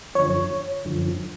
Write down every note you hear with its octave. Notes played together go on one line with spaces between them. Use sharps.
F#2 D3 F3 C#5
F#2 D3 F3